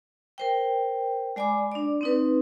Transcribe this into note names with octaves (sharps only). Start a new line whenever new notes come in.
A#4 C5 G5
G#3 D5 G#5 B5 D6
D4 D5
C4 D#4 B4